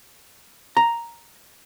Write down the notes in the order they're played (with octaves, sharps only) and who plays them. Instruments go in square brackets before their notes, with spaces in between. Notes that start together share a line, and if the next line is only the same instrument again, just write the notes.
[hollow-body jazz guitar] A#5